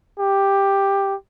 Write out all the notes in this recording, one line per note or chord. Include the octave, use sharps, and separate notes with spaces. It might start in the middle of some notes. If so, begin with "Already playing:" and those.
G4